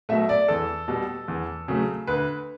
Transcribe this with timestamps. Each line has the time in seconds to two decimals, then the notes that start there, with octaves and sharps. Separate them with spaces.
0.09 B2 F#3 A3 E5
0.29 D5
0.48 E2 A4
0.88 B2 G3
1.28 E2
1.68 C#3 F#3 A3
2.07 D2 B4